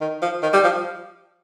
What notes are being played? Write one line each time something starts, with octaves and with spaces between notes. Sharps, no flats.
D#3
F3
D#3
G3
F3